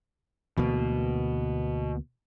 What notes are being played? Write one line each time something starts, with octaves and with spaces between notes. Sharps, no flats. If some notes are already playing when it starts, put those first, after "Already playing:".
D2 B2 E3 A#3